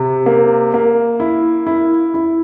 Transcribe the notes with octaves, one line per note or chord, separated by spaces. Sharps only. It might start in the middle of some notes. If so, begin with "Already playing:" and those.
Already playing: C3
A#3
A#3
E4
E4
E4